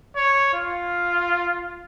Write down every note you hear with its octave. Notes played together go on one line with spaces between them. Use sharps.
C#5
F4